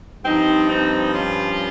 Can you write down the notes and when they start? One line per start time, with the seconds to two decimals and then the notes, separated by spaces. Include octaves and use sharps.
0.24 G2 F3 C4 D#4
0.68 C4 D#4
1.12 C#4 F4